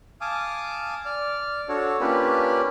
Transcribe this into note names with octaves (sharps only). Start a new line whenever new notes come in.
F5 G#5 A5 D6 D#6
D5 F6
D4 F#4 A4 C#5
A#3 C#4 D4 F4 G4 B4